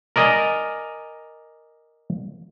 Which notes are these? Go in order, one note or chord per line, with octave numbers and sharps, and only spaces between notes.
A#4 D5 D#5 G#5 A#5